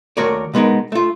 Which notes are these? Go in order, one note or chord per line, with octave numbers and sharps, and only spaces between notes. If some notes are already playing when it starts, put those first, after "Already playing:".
D#2 A3 F#4 A#4 C#5 D5
B2 G#3 B3 D#4 A#4
A3 F4